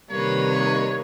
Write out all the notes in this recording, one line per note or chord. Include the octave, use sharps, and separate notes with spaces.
C3 D#3 G3 A#3 B4 C#5